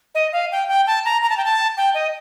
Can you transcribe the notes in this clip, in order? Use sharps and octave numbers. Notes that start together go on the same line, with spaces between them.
D#5
F5
G5
G5
A5
A#5
A#5
A5
G5
A5
G5
D#5